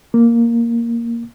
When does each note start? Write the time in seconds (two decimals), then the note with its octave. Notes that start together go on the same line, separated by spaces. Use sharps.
0.14 A#3